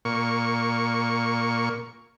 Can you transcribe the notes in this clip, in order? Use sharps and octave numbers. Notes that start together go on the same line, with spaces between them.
A#2 C#6